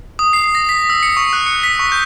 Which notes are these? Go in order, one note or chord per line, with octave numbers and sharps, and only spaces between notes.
D#6
C7
A#6
B6
E6
C#7
C#6
F#6
C#7
B6
C#6
G6